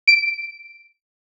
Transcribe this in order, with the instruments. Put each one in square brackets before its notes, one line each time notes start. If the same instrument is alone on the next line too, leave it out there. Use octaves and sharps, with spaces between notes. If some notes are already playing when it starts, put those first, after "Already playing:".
[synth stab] D7